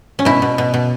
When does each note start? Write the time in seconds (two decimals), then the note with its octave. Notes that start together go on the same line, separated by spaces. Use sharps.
0.19 C#4
0.25 B2 E4
0.42 B2
0.58 B2
0.74 B2